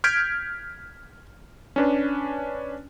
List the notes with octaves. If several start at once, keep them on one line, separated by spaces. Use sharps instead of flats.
F6 G6 G#6 B6 D7
C#4 D4 B4